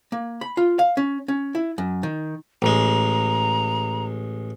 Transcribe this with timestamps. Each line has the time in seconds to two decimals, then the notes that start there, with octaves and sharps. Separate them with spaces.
0.12 A#3
0.41 B5
0.57 F4
0.79 F5
0.97 C#4
1.28 C#4
1.55 E4
1.78 F#2
2.03 D#3
2.62 A1 G#3 A#5